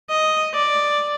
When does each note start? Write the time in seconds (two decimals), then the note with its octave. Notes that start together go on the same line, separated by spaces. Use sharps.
0.10 D#5
0.54 D5